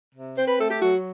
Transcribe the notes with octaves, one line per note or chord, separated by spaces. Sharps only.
C3
C4 C5
B4
A3 A4
G4
F#3 F#4